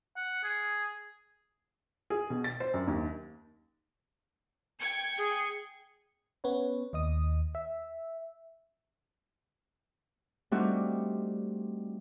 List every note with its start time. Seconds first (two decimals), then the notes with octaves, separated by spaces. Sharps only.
0.16 F#5
0.44 G#4
2.10 G#4
2.30 B2
2.44 A6
2.60 C5
2.74 F#2
2.87 D#2
4.79 G5 G#6 C#7
5.18 G#4
6.44 B3 C#4 B4 C#5
6.93 D#2 D#5 D#6
7.55 E5
10.52 G3 A3 C4 D4 D#4 F#4